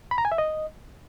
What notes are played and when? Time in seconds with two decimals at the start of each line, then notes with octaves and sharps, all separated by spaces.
0.11 B5
0.18 A#5
0.25 G#5
0.32 E5
0.38 D#5